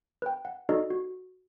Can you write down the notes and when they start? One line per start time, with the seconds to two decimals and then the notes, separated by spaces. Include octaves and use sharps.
0.22 B4 G5
0.45 F#5
0.69 D#4 F#4 A4 D5 D#5
0.90 F#4